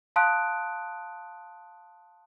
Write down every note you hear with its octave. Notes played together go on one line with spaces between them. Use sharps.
F5 A5 C6 D#6 F#6 D7